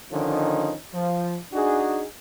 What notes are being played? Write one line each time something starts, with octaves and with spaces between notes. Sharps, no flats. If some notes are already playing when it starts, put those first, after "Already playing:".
D3 D#3 F3 C#4 D#4
F3
D4 D#4 F#4 G#4